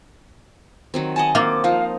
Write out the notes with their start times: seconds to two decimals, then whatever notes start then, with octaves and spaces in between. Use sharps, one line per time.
0.94 D#3 F#3 C4
1.16 D#5 F#5 G#5 A5
1.35 A#3 C4 F4 D6
1.64 F3 D#4 F5